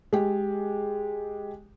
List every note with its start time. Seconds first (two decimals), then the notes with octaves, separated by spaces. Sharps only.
0.13 G#3 G4